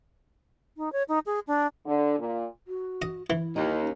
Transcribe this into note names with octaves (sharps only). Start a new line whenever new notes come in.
D#4
C#5
D#4
G#4
D4
D3
A#2
F#4
D#5
E3 E4
D#2 D#4
C#4